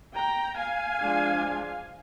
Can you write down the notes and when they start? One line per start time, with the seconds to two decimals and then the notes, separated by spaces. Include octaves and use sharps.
0.15 G5 A#5
0.58 F5 G#5
1.00 F3 G#3 D4